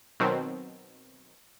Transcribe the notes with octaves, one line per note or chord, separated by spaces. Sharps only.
B2 D#3 F#3 C4